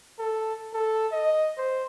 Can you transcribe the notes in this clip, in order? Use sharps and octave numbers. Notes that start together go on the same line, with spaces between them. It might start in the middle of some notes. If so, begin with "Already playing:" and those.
A4
A4
D#5
C5